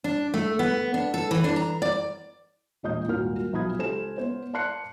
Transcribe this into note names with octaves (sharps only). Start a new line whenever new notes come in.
D4
A3
B3
D4
A4
E3
D4
A#5
D5
E1 A#2 D#5 D#6 G6
D#1 G#1 A#2 F#4 A#4 F6
B1 F3 B5 D#6 G#6
C#2 G4 A4 C5 G#5 E7
B3 C5 C#5
D5 A5 C6 F#6 C7 C#7